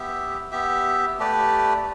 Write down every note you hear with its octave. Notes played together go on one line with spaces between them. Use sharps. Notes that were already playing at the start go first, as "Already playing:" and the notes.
Already playing: B3 G4 E5
B3 G4 E5
A3 G4 B4 D5